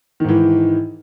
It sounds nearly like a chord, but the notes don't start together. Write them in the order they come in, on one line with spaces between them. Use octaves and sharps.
D#3 G#2 E3